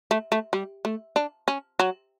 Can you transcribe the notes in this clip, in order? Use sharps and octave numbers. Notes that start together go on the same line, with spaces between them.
A3
A3
G3
A3
D4
C#4
F#3